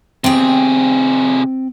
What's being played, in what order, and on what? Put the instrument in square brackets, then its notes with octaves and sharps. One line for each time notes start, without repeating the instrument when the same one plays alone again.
[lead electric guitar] C3 G#4 [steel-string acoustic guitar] C4 G5